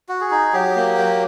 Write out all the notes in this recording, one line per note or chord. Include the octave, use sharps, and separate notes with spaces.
F#4
G#4
D#4
F#3 G4
A#3
F#3